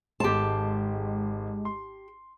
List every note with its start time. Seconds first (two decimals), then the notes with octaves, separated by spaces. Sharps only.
0.20 G#1 G#3 G4 A4 A5 C6
1.65 C6